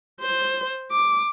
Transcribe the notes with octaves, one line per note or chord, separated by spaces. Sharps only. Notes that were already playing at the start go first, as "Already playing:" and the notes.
C5
D6